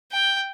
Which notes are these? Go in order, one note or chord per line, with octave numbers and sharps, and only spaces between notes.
G5